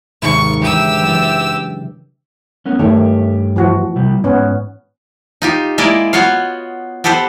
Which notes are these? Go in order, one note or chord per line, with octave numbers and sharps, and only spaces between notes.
G#1 D#2 C3 C#6
C#3 E3 D4 G4 E6
F#1 E3 A6
G6 E7
A#3 B3 C#4
G2 D#3 A3 G4 C#5
E3 F3 F#4
C3 G3
G#2 B3 C#4
D#4 F4 G4
G#3 A#3 E4 A#4 D5 D#5
B3 F4 F#4 C#5 F5
B3 G4 A4 B4 C5